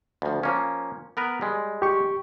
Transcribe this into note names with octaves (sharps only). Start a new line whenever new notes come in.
D2 F3
F3 A#3 C#4
B3 A#4 B4
G3 G#3
G4 C#6